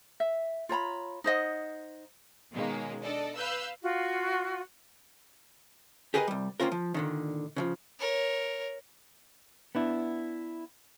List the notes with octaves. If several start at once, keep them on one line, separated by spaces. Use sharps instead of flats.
E5
F4 C#5 A#5 B5
D#4 C5 D#5 F#5
B2 D#3 G#3 A#3 C#4
D4 A4 D5 D#5
B4 F5 E6 F#6 G6
F4 F#4
G4 G#4 A#4 B4 D5 D#5
C2 G3
A#3 C4 C#4 F4 A#4
F3
A#2 D3 D#3
C#3 E3 F3
A#4 C#5
B3 D4 E4